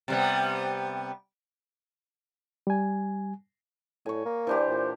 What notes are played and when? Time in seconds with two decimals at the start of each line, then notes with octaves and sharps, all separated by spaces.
0.08 C3 G3 B3
2.67 G3 G#5
4.06 A2 C#5 G#5
4.25 A#3
4.47 E3 D4 G4 C5
4.69 A#2